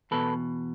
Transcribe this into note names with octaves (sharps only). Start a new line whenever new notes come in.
E2 B2 A4 B4